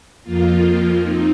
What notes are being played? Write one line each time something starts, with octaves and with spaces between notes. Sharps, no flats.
F2 F3 A#3 F4
C4 D#4